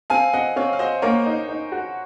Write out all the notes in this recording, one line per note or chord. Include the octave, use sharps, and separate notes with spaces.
C4 F5 G#5
C4 D#5 F#5
C4 C#5 F5
F5
F#4 C5 D#5
A#3 A#4 C#5
D#4
D#4
F#4